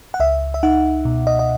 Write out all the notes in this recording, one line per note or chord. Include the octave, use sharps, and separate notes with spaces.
F#5
C#2 E5
E5
D#4 F#5
B2
D#5
D#5